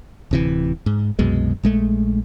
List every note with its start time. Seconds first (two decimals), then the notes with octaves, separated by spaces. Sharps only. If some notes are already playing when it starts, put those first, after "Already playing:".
0.31 D1 C3 E3
0.86 G#2
1.19 C2 F#2 B2 G#3
1.63 A#1 G#3 A3